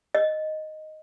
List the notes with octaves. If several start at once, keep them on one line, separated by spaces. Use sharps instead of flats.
D#5